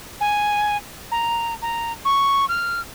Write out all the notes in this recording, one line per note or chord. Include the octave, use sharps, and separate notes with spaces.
G#5
A#5
A#5
C#6
F6